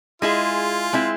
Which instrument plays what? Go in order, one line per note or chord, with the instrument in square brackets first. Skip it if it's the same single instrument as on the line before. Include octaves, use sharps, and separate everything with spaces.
[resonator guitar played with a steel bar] G#3 E4 G#4 [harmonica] F4
[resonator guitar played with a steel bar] G#3 C4 E4